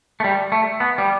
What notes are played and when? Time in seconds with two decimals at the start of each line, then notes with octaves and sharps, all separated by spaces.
0.20 A3
0.24 G3
0.52 A3
0.80 B3
0.98 G3